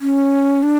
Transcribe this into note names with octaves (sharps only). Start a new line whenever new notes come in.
C#4
D4